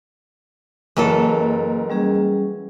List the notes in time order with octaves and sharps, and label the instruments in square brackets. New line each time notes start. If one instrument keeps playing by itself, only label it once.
[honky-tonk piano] F#1 A#4 [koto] E3 F#3 A4
[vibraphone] G3 C#4 G#4